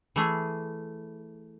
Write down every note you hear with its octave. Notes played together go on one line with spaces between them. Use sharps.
E3 A3 G#4